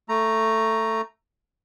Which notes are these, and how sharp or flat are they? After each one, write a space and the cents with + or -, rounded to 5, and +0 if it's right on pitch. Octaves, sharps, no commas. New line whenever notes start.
A3 +10 A#5 +0